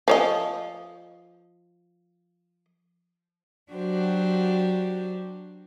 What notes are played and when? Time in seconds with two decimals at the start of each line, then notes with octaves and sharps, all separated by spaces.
0.08 F3 C#5 D#5
3.72 F#3 D4 F#4 G4 C5